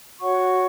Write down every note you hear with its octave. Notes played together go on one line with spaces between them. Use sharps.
F#4 C#5 F#5 C#6